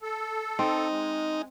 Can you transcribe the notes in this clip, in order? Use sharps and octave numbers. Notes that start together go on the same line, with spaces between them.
A4
C4 D#4
G#3